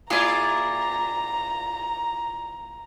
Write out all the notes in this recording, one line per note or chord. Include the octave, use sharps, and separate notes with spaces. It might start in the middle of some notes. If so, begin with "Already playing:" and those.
A#2 E4 F4 G#4 D5 A#5